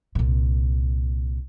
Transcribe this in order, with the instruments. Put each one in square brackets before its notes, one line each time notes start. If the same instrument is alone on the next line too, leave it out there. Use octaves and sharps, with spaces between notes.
[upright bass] C2 A#2